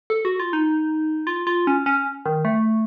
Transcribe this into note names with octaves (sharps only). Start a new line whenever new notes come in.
A4
F#4
F4
D#4
F4
F4
C#4
C#4
D#3
A3